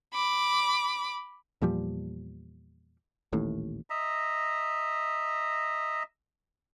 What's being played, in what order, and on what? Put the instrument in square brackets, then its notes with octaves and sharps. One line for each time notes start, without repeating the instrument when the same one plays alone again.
[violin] B5 D6
[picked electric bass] E2 A#2 F3 G3
D#1 A1 D#2 A2
[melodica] D#5 E5 A#5